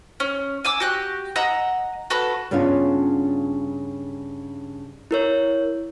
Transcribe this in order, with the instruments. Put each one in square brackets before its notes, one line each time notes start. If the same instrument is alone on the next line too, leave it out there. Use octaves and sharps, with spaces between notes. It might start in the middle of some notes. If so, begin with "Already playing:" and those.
[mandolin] C#4
G#5 D6 E6
F#4 G4 F#6
D#5 F#5 A#5 E6
F#4 A4 B4
[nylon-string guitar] G2 C#3 B3 C#4 D4 F4
[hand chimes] E4 A#4 C#5